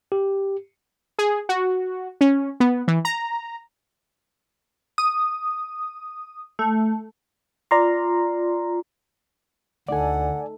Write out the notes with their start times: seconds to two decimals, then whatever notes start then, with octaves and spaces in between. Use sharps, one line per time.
0.12 G4
1.19 G#4
1.49 F#4
2.21 C#4
2.60 B3
2.88 E3
3.05 A#5
4.98 D#6
6.59 A3
7.71 F4 D5 A#5 C6
9.89 D2 A3 D#4 A4 D5 F#5 G#5